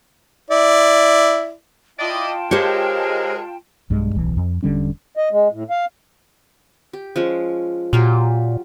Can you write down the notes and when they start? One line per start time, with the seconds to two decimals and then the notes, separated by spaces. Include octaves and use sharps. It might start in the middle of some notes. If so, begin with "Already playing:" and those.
0.51 E4 D5
1.99 E4 F4 D5 D#5 G5 A5
2.51 G#3 G4 A#4 C5 C#5
3.90 B1 G2 G3 G#3
4.15 D1 B1 E3
4.37 F2
4.63 E1 D3 G3 C#4
5.17 D#5
5.31 G#3
5.52 A2
5.70 F5
6.93 G4
7.16 F3 G#3 C#4
7.93 A#2 F#3 F4 G4